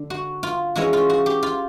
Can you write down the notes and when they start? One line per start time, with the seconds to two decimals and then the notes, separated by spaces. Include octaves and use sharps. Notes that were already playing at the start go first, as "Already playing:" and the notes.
Already playing: D3
0.10 F#4
0.43 F4
0.76 E3 G#3 C#4 E4 F#4
0.93 F4
1.10 F#4
1.26 G4
1.43 F4